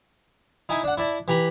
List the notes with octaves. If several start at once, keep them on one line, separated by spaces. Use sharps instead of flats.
D#4 E4 G#5
D4 F#5
E4 D5 A5
E3 G4 A#5 B5